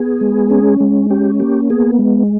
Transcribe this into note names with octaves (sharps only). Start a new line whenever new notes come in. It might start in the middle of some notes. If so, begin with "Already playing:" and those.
Already playing: B3 G#4
G#3
C#4
G#3
C#4 G4
A#3 G4
B3 G#4
G#3